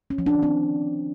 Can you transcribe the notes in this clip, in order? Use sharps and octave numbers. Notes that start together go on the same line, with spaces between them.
C#4
F3
D4
D#3
C4